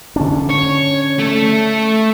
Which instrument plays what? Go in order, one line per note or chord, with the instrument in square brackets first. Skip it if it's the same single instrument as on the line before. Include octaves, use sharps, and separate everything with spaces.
[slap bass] D3 C#4 D4
[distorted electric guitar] C#5
A3 A4